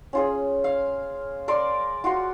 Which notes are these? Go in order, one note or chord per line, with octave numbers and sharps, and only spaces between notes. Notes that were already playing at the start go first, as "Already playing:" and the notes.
C#4 F4 G#4
F5
A#4 D5 C6
F4 F#4 C6